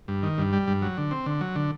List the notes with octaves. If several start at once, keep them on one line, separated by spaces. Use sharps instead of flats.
G2
D#3
G2
G3
G2
F#3
D3
C4
D3
F#3
D3